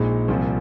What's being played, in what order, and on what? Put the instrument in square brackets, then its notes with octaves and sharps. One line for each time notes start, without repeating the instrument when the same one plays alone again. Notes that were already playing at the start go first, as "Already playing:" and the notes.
Already playing: [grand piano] A#1 A#2 G#3 D#4
C2 A#2 F3 C4